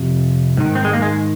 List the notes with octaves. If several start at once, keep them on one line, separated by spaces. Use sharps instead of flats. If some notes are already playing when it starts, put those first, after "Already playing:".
Already playing: F2 C3
G#2 D#3
C4
G#3
A#3
G#3